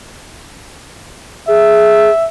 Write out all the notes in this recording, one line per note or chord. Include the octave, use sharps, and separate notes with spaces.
G#4 E5